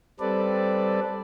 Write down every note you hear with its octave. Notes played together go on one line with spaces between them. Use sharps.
G3 C4 A4 B4 D5